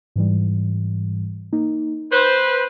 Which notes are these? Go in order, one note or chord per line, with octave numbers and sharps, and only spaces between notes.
G#2 E3 G3
A#3 D#4
B4 C5 G6